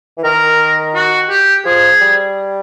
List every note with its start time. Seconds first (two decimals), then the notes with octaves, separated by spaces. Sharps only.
0.18 E3
0.24 D#3 A#4
0.95 F#4
1.30 G4
1.66 F3 G#4
2.01 G3